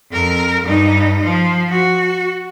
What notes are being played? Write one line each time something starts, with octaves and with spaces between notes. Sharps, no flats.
F2 A#4
G2 D#4
F3
F#4